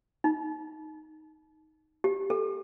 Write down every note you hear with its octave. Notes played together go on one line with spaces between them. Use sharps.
D#4
G4
A4